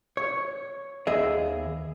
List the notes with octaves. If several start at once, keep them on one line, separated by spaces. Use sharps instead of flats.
C#5
D#2 B3 G#4 D#5 E5